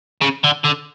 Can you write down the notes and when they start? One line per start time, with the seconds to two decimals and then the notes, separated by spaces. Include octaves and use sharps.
0.22 C#3
0.44 D3
0.64 D3